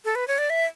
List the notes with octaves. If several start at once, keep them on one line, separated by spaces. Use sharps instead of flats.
A4
B4
C#5
D5
E5